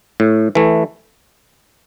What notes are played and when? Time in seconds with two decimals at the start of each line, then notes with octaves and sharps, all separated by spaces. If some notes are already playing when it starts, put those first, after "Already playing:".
0.20 A2
0.55 E3 A3